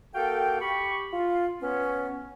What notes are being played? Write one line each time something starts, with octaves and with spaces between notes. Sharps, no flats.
A#3 F#4 A4 F5 G5
G4 B5 C#6
F4
B3 C#4